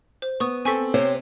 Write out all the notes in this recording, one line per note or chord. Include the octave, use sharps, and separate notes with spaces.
C5
B3 C#6 D#6
C4 A4 G#5 C#6 B6
C3 C4 C5 C#5